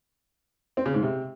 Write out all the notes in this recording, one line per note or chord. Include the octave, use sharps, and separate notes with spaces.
C4
C#3
G#2
C3